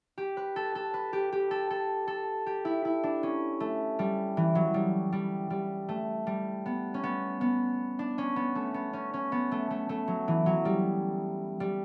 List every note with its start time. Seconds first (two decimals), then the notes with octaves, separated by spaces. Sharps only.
0.18 G4
0.37 B4
0.56 A4
0.75 A4
0.94 B4
1.13 G4
1.32 G4
1.51 A4
1.70 A4
2.07 A4
2.46 G4
2.65 E4
2.85 E4
3.03 D4
3.23 C#4
3.60 A3
3.99 G3
4.37 E3
4.55 F#3
4.74 G3
5.12 G3
5.50 G3
5.89 A3
6.27 G3
6.66 B3
6.94 C#4
7.03 B3
7.41 B3
7.99 D4
8.18 C#4
8.36 B3
8.55 A3
8.74 B3
8.93 C#4
9.14 C#4
9.32 B3
9.52 A3
9.70 A3
9.89 A3
10.08 F#3
10.28 E3
10.46 F#3
10.65 G3
11.60 G3